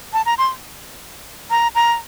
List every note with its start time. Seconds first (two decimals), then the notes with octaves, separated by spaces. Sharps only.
0.13 A5
0.26 A#5
0.38 C6
1.50 A#5
1.75 A#5